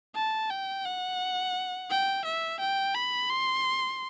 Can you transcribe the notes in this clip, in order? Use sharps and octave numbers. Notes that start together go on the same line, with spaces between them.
A5
G5
F#5
G5
E5
G5
B5
C6